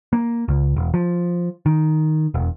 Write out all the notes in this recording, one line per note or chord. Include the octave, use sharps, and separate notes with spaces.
A#3
C#2
E1
F3
D#3
E1